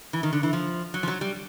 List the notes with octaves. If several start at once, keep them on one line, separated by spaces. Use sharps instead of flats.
E3
D#3
D3
E3
F3
F#3
F3
F#3
G3